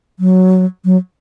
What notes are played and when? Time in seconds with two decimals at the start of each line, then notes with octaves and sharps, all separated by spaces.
0.19 F#3
0.85 F#3